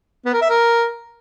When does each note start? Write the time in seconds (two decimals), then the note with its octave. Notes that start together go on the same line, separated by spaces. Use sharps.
0.26 B3
0.34 A#4
0.42 E5
0.50 A#4